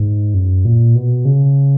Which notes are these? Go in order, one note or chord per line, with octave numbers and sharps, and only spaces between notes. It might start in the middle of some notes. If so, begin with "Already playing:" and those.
Already playing: G#2
F#2
A#2
B2
C#3